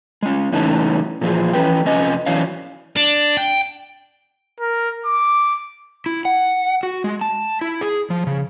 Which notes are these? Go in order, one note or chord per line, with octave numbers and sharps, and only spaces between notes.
G#3 C#4
A2 C#3 E3 C#4 D#4 A5
A#2 E3 F3 G#4
E3 C#4 B4 G5
F2 C3 C#4 D#5 G#5
E3 F#3 C#4 C#5 F5
D4
G5
A#4
D6
E4
F#5
F#4
G#3
A5
E4
G#4
F3
C#3